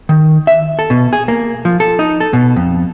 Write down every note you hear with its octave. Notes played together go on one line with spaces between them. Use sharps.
D#3
E5
A4
B2
G#4
A#3
F3
A4
D#4
A4
B2
F2